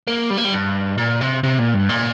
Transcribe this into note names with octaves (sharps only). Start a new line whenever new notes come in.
A#3
G3
A#3
G3
G2
A#2
C3
C3
A#2
G2
A#2